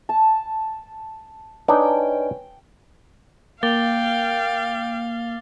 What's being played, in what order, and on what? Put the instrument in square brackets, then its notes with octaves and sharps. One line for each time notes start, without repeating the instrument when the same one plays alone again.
[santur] A5
[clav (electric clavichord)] D4 D#4 [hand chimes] B4 C#5 G#5 [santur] G5
[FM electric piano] A#3 [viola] F5 [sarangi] G5 [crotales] D6 A6 G7